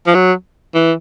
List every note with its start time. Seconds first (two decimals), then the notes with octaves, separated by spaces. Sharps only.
0.07 F3
0.15 F#3
0.74 E3